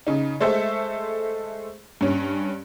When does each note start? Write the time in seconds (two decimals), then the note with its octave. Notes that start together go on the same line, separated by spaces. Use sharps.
0.07 C#3 D#4
0.40 G#3 A3 A4 C5 E5
2.01 G2 C#4